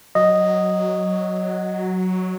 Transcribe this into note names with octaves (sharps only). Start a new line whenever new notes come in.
F#3 D#5